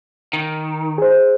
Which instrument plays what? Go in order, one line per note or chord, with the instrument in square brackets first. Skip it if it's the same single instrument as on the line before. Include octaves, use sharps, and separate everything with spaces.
[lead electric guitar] D#3
[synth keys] G#4 C5